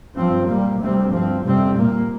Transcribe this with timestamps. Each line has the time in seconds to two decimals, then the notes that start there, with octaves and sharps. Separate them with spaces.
0.16 G2 F3 C4
0.47 A#2 G3 A#3
0.78 D2 C3 G3 C4
1.10 G2 F3 C4
1.43 F2 C3 G3 C4
1.74 C2 A#2 A#3